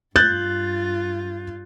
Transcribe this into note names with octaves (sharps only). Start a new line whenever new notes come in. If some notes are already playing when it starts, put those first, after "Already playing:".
G2 F4 F#6 G6 A6